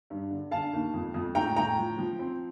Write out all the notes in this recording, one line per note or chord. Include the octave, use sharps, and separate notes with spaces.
G2
D3
D3 F5 A5
D#2
F2
F2
A2 G5 A#5
A2 G5 A#5
F3
F3
C4